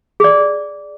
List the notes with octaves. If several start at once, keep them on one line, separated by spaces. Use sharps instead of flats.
G#4 D5